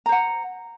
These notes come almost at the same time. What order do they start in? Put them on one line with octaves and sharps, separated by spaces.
A#5 C5 F#5